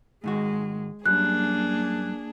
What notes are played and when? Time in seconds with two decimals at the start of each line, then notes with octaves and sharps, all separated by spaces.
0.24 G#2 D#3 G#3 F#4
1.06 F#2 G3 A#3 D4 G#4 F#6